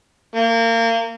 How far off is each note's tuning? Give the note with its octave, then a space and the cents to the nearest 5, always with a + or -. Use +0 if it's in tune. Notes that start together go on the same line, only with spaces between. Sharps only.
A#3 -30